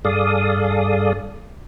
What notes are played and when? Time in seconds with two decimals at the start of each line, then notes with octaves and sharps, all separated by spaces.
0.05 G2 G#4 A4 D5 F5 D#6